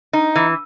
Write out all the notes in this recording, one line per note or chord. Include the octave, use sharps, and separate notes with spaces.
D#4
E3